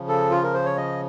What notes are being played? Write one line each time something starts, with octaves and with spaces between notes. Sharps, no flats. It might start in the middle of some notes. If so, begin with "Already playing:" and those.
Already playing: C#3 F3
A4
F4
A#4
C5
C#5
D#5